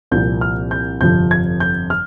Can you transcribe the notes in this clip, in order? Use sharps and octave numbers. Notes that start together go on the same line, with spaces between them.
C2 A#2 F3 G6
F6
G6
G1 F2 C3 F3 G6
G#6
G6
F6